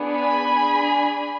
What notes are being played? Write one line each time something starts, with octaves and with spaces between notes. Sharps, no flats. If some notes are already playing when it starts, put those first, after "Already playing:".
Already playing: B3 D4 G#4
G#5 B5
D4 G#4